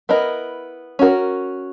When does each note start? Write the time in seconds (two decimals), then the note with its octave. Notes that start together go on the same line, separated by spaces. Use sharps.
0.09 B3 E4 A#4 D#5
0.99 C#4 F#4 A#4